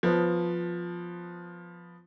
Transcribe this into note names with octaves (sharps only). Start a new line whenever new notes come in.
F3 B3